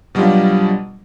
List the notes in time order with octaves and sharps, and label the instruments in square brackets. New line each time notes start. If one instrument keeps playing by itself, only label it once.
[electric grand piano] B2 F#3 G3 D4 F4